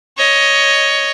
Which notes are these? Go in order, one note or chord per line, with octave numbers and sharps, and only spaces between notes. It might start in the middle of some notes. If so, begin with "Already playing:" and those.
C#5 D#5